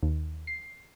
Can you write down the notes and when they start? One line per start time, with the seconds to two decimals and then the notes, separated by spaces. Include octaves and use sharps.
0.03 D#2
0.47 C7